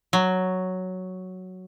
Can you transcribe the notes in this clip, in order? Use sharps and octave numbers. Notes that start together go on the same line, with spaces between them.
F#3